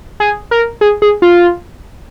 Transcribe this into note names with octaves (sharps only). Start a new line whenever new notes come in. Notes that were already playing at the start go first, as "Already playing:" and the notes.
G#4
A#4
G#4
G#4
F4